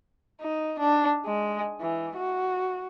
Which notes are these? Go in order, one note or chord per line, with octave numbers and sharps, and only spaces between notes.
D#4
D4
G#3
E3
F#4